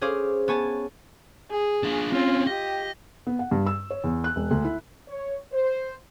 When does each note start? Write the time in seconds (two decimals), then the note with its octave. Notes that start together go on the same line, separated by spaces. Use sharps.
0.01 C#4 G#4 C5 F5 D6
0.48 B3 C#5 G#5 A5
1.51 G#4
1.83 D4 F4
2.12 C4 C#4 F4
2.47 G4 D#5
3.27 B3
3.39 F#5
3.51 G2
3.67 E6
3.90 C#5
4.04 E2
4.24 F#6
4.36 E1
4.51 D2
4.64 E4
5.08 C#5
5.52 C5